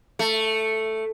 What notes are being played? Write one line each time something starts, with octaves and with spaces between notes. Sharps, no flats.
A3